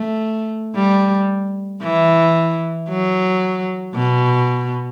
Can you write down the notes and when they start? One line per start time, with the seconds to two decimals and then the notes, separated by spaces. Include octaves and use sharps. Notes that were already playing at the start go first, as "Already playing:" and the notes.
Already playing: A3
0.76 G3
1.82 E3
2.89 F#3
3.95 B2